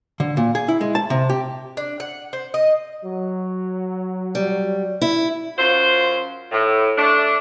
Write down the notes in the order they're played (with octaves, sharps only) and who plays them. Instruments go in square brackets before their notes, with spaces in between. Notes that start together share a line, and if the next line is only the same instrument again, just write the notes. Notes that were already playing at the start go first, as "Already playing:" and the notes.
[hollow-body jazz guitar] D3
A#2
G#4
E4
G#3
A5
C3
G4
[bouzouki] D4
F#5
C5
D#5
[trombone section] F#3
[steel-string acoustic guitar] G3
E4
[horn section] F#2 F4 C5
A2
A3 D4